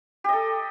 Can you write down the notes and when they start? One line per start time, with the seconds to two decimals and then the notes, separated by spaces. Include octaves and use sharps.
0.24 G4
0.29 D#5
0.33 A4